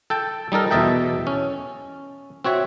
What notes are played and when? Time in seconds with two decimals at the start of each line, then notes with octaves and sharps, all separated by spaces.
0.10 A4 G5 A5
0.52 G3 D#4 A4 A#4
0.71 E2 B2 A4 D#5 E5 G5
1.27 C#4
2.45 C4 F#4 C#5 E5